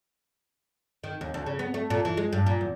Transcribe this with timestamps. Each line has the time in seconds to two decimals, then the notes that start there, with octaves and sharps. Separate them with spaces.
1.04 D#3
1.21 D#2
1.34 D2
1.46 C#3
1.59 B3
1.74 A3
1.90 A#2
2.05 E3
2.17 G#3
2.33 G2
2.46 A#2
2.61 E2